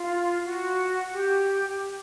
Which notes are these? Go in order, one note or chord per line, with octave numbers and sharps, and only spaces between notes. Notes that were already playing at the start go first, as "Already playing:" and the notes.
Already playing: F4
F#4
G4